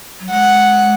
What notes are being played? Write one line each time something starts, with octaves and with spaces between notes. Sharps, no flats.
F#3
G#3 F#5